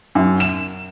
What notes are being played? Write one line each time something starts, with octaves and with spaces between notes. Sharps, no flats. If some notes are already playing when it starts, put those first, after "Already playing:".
F#2
E7